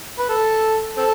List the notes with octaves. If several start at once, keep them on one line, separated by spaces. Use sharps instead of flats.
B4
A4
C4 A4